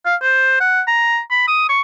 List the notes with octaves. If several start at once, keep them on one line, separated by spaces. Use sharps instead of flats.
F5
C5
F#5
A#5
B5
D#6
C#6